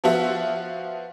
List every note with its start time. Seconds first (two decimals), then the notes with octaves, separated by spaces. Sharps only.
0.04 F3 B3 F4 F#4 E5